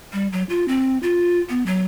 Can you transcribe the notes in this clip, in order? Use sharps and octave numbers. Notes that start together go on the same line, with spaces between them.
G3
F#3
F4
C4
F4
B3
F#3